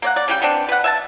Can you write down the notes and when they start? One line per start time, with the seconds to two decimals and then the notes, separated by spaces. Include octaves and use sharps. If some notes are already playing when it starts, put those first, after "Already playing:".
0.02 A#3 C#5 F#5
0.16 D5
0.28 C#3 G3 G5
0.41 B3 C4 D4
0.69 B4 F#5
0.84 E5 G#5 A5